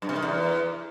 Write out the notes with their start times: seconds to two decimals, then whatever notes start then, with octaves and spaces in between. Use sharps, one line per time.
0.02 G2
0.09 C3
0.16 D#3
0.22 E2